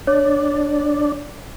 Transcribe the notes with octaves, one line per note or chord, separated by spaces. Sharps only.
D4 C#5 D5